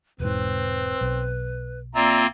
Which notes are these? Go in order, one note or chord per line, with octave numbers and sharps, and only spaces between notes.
E1 G#2 C4 B4
B1
A#3 C4 F4 D5 E5 A#5